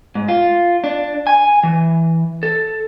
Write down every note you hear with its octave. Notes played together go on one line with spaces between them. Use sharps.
G#2
F4
D4
G#5
E3
A4